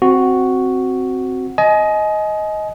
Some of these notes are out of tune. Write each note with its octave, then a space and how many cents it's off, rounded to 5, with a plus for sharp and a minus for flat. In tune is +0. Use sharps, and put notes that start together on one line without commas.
C4 +0 F#4 +0
D#5 +10 G#5 +35